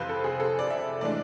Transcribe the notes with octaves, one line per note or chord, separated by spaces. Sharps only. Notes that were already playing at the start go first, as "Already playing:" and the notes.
Already playing: F2 C3 E3 B4 C5 F5
A4
G#4
A4
D5
E5
A2 E3 G#3 D4 D5